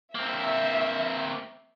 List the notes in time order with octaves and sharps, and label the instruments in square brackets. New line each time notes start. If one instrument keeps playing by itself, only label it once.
[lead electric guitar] A#3 C4 [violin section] E5